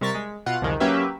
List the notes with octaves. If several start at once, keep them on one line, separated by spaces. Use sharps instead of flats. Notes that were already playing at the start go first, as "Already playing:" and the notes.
C3 G3 A#4 C#6 A6 B6
G#3
B2 F4 F#5
C2 F2 D3 D#3 G#3
F#3 A#3 C#4 G4 B4 E5